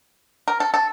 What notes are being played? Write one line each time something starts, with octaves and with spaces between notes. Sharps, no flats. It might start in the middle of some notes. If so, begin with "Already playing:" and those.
A#4
A4
A4